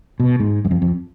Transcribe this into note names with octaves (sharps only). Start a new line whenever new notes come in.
B2
G#2
F#2
F2
F2